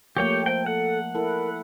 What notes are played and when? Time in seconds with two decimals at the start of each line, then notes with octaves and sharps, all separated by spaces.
0.17 F3 A3 A#3 G4 A#4 C#5 G5
0.46 C5 G5
0.66 A4 F#5
1.15 E4 A4 A#4